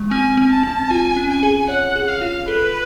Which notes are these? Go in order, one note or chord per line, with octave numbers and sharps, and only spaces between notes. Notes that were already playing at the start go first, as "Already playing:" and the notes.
Already playing: G#3
C4 G#5
C4
A5
C4
F4 G#5
C#4
G#5
G#4
C#5 F#5
G#4
F5
F4
A4 B4